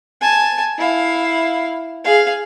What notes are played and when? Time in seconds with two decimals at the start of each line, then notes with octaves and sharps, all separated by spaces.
0.21 G#5 A5
0.78 E4 F5
2.04 G#4 F5